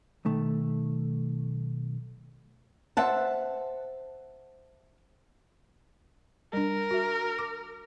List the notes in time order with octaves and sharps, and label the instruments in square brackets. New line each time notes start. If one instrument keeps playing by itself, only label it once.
[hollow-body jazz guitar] B1 D#3 A3
[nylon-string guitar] C5 E5 F#5 A5
[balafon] G3 D4 [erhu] A#4
[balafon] F#4 E5
D6